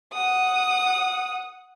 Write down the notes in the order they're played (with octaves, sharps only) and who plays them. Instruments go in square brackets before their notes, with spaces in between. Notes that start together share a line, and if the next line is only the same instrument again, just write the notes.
[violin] F#5 D#6